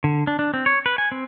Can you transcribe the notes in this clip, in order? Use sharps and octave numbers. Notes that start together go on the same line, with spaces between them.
D3
D4
D4
C4
C#5
B4
G#5
C4